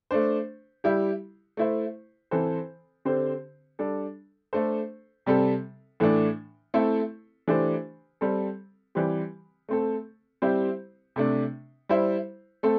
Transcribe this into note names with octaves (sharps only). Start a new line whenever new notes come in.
A3 D4 C5
G3 E4 G4
A3 E4 C5
E3 C4 A4 C5
D3 C4 G4 C5
G3 D4 A4
A3 D4 A4 C5
C3 G3 C4 A4
A2 E3 A3 D4
A3 C4 E4 A4
E3 A3 D4 G4 C5
G3 C4 A4
E3 G3 C4 G4
A3 C4 A4
G3 C4 E4 G4 C5
C3 A3 D4
G3 E4 C5
A3 C4 A4